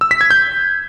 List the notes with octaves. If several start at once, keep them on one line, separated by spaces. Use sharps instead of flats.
E6
B6
G#6
G6